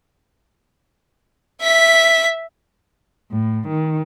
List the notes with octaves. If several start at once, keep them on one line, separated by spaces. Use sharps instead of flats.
E5 B6
A2
D#3